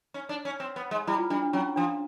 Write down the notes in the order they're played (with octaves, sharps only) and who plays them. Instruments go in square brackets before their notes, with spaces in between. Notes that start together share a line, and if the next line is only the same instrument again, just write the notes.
[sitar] C#4
D4
C#4
C4
B3
G#3
[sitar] G3 [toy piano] E4
[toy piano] F4
[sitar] G3 [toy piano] D4
[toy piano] D4
[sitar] F#3 [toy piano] C#4
[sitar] F3 [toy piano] D4